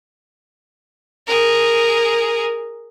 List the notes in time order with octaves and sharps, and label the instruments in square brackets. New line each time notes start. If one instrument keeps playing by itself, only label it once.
[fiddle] G#4 A#4